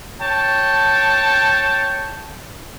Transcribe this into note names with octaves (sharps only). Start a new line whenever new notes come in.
C#5 G5 A5